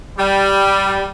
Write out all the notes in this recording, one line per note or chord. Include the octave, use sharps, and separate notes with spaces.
G3